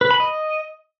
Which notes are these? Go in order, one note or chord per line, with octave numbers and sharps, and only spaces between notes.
B4
B5
D#5